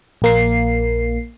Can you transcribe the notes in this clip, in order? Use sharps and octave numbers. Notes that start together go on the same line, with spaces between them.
A#1 A#3 C7